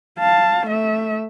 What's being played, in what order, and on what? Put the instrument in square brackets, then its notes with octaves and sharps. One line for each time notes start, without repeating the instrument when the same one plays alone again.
[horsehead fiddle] F5 A5
A3 E5